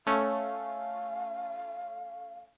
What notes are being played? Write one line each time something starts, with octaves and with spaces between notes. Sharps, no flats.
A3 C#4 F5